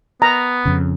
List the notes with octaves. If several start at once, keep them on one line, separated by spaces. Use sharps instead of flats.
B3 A#5
F2 C#3